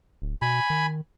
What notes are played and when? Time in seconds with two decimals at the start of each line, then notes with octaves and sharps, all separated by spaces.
0.22 D1
0.42 B2 G#5 B5
0.70 D#3